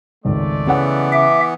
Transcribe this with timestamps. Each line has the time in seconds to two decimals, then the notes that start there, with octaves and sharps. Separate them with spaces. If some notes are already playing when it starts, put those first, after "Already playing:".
0.25 G#1 C#2 G#3 A3 D5
0.67 C#3 E3 B3 F#5
1.12 E5 D6